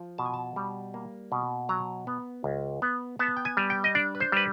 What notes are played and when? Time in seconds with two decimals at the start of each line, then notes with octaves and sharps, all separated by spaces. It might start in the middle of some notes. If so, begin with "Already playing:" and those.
Already playing: F3
0.18 B2 A5
0.26 G#5
0.34 A5
0.56 G3
0.94 A#3
1.32 B2
1.69 F#3 A#5
2.07 B3
2.44 C#2
2.82 B3
3.19 B3 A5
3.37 G5
3.45 G#5
3.57 G3
3.70 G5
3.84 D#5
3.95 D4 D5
4.15 B4
4.20 C5
4.32 G3 B4